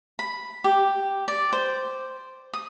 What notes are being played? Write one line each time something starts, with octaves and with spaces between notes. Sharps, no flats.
B5
G4
D5
C5
D#6